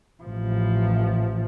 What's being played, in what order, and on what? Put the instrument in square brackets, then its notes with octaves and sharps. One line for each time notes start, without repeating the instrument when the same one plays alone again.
[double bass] A1 F3